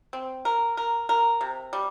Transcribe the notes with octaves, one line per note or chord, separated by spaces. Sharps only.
C4
A#4
A#4
A#4
C3
G3